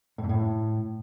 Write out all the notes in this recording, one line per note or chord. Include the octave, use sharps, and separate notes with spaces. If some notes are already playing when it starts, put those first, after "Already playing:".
A2
G#2
A2